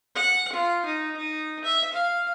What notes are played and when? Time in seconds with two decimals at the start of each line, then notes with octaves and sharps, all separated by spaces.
0.15 F#5
0.53 F4
0.85 D#4
1.17 D#4
1.64 E5
1.93 F5